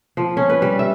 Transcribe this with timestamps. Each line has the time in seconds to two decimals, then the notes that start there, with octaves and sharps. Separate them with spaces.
0.17 F3
0.37 C#4
0.49 B4
0.62 G3
0.79 E5